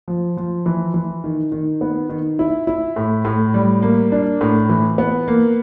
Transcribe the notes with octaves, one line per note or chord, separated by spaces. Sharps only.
F3
F3
E3
E3
D#3
D#3
B3
D#3
E4
E4
A2
A2
G3
A#3
D4
A2
E3
B3
A#3